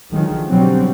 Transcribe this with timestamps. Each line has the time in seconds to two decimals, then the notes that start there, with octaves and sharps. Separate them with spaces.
0.12 D3 D#3 F3 F#3 G#3
0.50 B2 D3 F#3 G3 C4 C#4